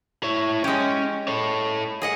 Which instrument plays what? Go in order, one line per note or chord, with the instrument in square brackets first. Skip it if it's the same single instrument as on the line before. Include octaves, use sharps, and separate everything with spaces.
[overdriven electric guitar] E4 C#5
[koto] G#3 G4 [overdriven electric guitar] C#4
[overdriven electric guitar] A4 C#5
[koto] G#4 D#5 F#5